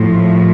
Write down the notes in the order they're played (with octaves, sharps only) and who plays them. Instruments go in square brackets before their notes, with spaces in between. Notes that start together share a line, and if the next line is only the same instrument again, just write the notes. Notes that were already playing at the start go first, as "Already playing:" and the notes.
Already playing: [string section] A2 F3